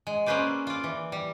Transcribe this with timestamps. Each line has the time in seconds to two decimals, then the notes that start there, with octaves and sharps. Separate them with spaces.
0.07 G#3
0.26 A#3 C#4 G#4 B4 C5 D5
0.67 F4 D5
0.84 E3
1.12 G3